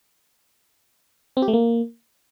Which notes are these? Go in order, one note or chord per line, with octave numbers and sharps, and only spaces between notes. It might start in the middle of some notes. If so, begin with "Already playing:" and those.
C4
G4
A3
A#3